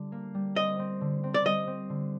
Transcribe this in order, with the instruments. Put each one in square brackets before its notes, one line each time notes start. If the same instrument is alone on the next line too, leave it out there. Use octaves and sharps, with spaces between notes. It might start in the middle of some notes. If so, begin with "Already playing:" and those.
Already playing: [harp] D3 G3
A#3
G3
[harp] C4 [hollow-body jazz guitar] D#5
[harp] C4
D3
C4
[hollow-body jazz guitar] D5
[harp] G3 [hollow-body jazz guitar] D#5
[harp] C4
D3